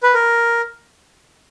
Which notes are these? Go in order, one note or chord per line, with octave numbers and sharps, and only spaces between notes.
B4
A#4